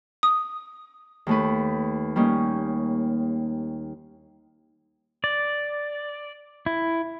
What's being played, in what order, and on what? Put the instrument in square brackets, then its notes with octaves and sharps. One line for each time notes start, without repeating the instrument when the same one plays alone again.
[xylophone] D#6
[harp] D#2 A3 B4
G3 A#3 C#4 D#4
[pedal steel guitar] D5
E4